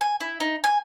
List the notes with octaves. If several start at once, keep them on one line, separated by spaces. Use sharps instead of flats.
G#5
E4
D#4
G#5